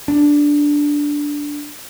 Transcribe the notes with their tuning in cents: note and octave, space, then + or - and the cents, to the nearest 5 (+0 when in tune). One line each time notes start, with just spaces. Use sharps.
D4 -5